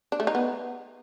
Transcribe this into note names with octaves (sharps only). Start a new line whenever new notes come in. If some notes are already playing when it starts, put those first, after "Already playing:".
D4
A3
D#4
B3